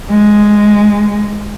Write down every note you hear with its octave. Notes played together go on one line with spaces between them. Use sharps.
G#3